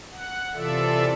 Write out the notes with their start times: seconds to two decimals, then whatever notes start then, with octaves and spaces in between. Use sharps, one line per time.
0.12 F#5
0.54 C3 E3 F4 A4 D5 E5